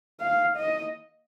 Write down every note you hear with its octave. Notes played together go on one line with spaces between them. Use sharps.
F5
D#5